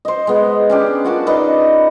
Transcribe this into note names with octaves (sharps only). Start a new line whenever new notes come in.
C5 D#5
G#3 B3
C#4 D4 G4
F4 F#4 A#4 A5
D#4 B4 D5 D#5